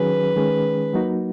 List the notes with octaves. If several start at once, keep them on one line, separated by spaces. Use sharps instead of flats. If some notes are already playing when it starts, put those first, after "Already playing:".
Already playing: D#3 F#3 C#4 G#4 B4
D#3 G#3 C#4 G#4
F#3 A#3 D#4 F#4